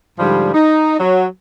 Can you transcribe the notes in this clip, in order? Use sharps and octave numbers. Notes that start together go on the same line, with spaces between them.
G#2 D3 F3 G3
D#4
F#3